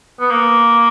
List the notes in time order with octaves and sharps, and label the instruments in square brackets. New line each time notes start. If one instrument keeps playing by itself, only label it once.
[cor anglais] B3
A#3